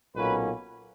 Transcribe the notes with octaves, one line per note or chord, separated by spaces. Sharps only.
B1 A#2 F#3 A#3 C#4 B4